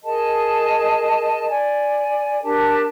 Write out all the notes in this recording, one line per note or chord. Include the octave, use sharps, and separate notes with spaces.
G#4 A#4 D#5 A5
D5 G#5
D4 G4 A#4 A5